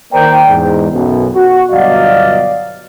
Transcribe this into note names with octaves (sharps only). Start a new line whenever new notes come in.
D#3 A#3 A#4 C5 D5 G5
E2 G#2
B1 F#2 B2
F#4
G1 B2 F#3 D5 D#5 F5